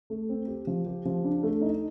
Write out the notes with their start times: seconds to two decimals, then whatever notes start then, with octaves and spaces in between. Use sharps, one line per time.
0.10 A3
0.29 C4
0.48 G4
0.67 F3
0.86 G4
1.05 F3
1.24 D4
1.43 A3
1.61 D#4